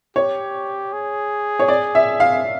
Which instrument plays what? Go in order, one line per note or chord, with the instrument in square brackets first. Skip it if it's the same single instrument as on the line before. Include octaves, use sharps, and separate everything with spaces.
[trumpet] G4 [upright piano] C#5
[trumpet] G#4
[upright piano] C#5
D5
E5
F5